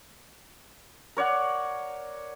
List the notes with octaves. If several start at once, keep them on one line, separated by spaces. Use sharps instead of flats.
A#4 C#5 D5 F#5